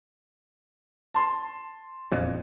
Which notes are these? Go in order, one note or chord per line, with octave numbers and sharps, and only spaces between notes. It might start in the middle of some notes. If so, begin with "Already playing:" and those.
A5 C6
E1 F2 A#2